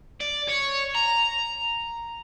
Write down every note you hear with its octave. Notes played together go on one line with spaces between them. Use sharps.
D5
C#5
A#5